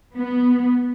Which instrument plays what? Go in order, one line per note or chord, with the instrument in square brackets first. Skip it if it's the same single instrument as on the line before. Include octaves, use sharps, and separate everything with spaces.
[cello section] B3